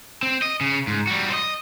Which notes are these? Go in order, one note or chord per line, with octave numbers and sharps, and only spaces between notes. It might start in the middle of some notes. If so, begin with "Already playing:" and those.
C4
D#5
C#3
G#2
G3 F#4
C5 D#5